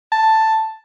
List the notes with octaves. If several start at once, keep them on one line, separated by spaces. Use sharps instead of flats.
A5